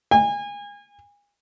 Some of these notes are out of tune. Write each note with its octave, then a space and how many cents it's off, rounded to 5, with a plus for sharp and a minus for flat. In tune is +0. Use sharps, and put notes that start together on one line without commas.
G#5 -30